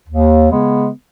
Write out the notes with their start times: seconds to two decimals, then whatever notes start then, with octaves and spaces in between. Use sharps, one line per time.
0.09 D#2
0.49 C#3 G#3 B3